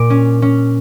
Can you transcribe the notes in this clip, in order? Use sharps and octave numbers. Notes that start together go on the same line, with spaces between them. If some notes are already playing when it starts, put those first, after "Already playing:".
Already playing: A#2 D6
C#4
C#4